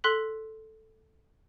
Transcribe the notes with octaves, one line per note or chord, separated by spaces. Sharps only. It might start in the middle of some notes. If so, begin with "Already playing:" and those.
A4 C6 F#6 B6 F#7